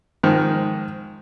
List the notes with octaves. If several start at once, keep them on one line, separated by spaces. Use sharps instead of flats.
G#2 D#3 F3